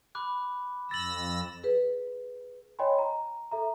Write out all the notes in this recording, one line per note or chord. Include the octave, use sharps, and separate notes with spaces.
B5 D6 F#6
F2 E6 A6 A#6 F#7
G#4 B4
C#5 D#5 G5 G#5 B5 C6
A#5
A4 E5 A#5